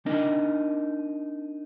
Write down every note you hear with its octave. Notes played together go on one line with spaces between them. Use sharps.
C4 D4 D#4 A#4 D#5